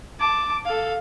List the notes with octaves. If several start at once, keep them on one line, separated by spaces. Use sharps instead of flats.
A5 D6
A4 F5